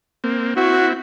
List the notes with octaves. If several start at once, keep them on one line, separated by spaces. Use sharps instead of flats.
A#3 C4
C4 E4 F#4